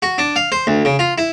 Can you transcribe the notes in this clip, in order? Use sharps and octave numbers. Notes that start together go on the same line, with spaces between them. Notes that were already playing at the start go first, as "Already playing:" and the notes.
F#4
D4
F5
C5
D2
C#3
F4
E4